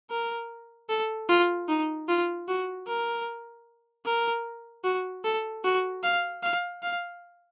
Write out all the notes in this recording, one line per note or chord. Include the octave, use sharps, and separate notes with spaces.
A#4
A4
F4
D#4
F4
F#4
A#4
A#4
F#4
A4
F#4
F5
F5
F5